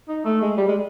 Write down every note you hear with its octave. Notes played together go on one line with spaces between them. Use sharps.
D#4
A3
G#3
G3
G#3